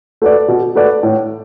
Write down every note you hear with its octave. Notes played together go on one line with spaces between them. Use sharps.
A3 F#4 B4 D5
B2
A3 F#4 B4 D5
A2